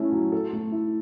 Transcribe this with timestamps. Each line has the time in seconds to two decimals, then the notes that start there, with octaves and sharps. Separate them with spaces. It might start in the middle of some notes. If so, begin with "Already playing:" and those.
Already playing: A3 C#4 E4
0.12 F#3
0.32 A4
0.53 A3
0.72 E4